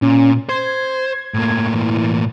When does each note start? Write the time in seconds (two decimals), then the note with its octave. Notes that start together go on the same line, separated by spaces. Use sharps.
0.02 A#2 C#4
0.49 C5 G#6
1.34 A2 A#3
1.73 E3